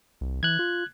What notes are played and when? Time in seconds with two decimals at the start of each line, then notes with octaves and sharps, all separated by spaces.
0.21 C2
0.43 E3 F#6 G#6
0.59 F4